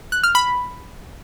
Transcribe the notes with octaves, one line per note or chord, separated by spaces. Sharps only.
F#6
F6
B5